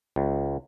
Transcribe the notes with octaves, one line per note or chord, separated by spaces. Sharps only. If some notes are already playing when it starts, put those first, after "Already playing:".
C#2